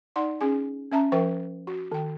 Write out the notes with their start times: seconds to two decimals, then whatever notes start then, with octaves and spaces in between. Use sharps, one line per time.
0.16 D#4 D5 F#5 C6
0.41 C#4 G#4 G#5
0.92 C#4 E5 A5 A#5
1.12 F3 A#4 E5 G5 C#6
1.67 F#4
1.92 D#3 G5